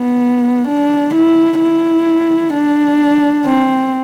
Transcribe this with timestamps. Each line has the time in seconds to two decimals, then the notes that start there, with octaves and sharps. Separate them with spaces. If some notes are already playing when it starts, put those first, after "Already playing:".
Already playing: B3
0.68 D4
1.15 E4
1.60 E4
2.54 D4
3.46 C4